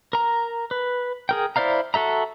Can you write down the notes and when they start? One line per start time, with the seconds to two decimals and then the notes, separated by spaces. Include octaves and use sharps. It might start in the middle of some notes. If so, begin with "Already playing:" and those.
0.13 A#4 A#5
0.71 B4
1.29 G#4 A#4 G5
1.56 E4 C5 D5 F5 A#5
1.94 F#4 A4 E5 A#5